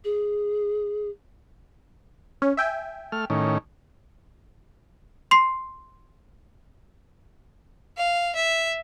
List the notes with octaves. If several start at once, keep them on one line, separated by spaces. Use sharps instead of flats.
G#4
C#4
E5 G5 G#5
A3 F6
A2 D#3 C#4
C6 C7
F5
E5